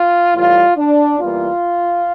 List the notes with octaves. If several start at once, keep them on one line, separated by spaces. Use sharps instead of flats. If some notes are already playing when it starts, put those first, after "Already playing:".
Already playing: F4
A2 E3 G3 F4
D4
E2 E3 G3 A#3 F4